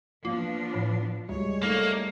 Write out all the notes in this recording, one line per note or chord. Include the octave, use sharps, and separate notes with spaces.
F3 A#3 B3 D4 F4
A2
D2 G3 G#3 C#5
A3 A#3 D#4